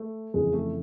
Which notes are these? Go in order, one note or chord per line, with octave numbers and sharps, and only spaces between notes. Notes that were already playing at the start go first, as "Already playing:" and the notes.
Already playing: A3
F2 C#3 E3 G#3
A3